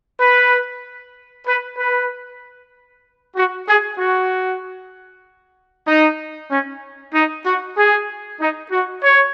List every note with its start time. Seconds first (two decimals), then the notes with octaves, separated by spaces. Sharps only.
0.20 B4
1.47 B4
1.78 B4
3.36 F#4
3.67 G#4
3.99 F#4
5.87 D#4
6.51 C#4
7.14 D#4
7.46 F#4
7.77 G#4
8.40 D#4
8.72 F#4
9.03 C#5